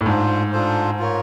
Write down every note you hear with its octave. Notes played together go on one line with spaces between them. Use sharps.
A2
G#2 D4 F4 A4 C5
D4 F4 A4 C5
F4 A#4 C#5